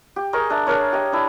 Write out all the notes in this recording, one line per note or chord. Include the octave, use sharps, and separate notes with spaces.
G4
G#4 A#4 D#5 C#6
D4 E5 A#5
D4 G#4 A#4 C#5
G4 D#5
D4 E4